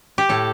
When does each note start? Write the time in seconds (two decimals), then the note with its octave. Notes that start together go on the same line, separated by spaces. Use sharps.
0.18 G4
0.29 A2 A4